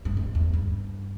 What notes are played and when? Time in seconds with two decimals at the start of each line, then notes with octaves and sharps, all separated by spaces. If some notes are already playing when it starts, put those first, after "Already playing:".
0.05 G2
0.17 G#2
0.35 E2
0.54 G2